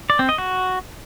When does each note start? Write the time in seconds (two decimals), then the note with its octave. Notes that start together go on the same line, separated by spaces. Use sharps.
0.10 D5
0.19 C4
0.29 D#5
0.38 F#4